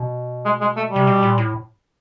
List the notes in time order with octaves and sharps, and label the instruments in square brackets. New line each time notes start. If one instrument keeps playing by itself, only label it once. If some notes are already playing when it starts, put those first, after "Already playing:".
Already playing: [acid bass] B2
[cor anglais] G#3
G#3
A3
[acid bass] C3 [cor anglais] G3
[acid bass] B2
A#2
A2